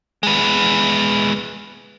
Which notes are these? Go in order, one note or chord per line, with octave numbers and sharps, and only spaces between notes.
G#3 B3